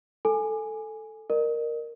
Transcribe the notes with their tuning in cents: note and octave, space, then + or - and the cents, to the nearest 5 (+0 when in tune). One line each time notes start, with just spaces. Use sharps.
A4 +0 G#5 +0
A#4 +0 D#5 -40